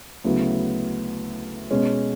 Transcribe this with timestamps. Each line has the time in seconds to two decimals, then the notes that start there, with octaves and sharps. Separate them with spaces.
0.24 D2 C#3 F#3 B3 E4
1.71 B2 G#3 C#4